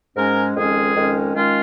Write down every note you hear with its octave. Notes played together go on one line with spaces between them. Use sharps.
G#2 G#3 C#4 A#4
F2 D#3 G#3 C#4 G#4
F2 D#3 G#3 C#4
D#3 G#3 C#4 F4